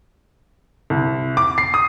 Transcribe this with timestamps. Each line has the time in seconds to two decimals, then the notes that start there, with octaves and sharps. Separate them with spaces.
0.90 C2
1.37 D6
1.58 C7
1.74 D#6